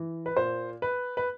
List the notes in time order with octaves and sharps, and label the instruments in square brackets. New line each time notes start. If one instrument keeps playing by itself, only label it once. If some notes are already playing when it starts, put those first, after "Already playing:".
Already playing: [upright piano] E3
B4
A#2 C5
B4
B4